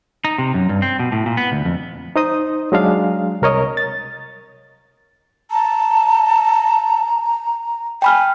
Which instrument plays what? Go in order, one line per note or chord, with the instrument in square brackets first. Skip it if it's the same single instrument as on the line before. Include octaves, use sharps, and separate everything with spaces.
[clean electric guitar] D#4
C3
F#2
G2
C4
B2
A2
A#2
B3
D2
F2
[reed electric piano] D#4 C5 D#5 D#6
F#3 G#3 D4 F5
C2 A#4 C#5 D#5
A6
[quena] A5 [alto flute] A#5
[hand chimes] G5 B5 F6 [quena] G#5